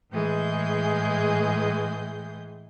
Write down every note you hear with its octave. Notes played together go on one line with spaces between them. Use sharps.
A2 E3 G#3 G#4 G6